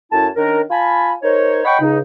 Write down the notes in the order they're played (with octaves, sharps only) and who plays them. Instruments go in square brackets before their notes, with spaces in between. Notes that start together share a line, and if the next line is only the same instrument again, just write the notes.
[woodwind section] F#2 A3 E4 A5
D#3 C#4 D4 A#4
F4 F5 G#5 A5 B5
D#4 A#4 C5 C#5
C#5 D#5 F#5 G5 B5 C#6
C#2 C#3 D#4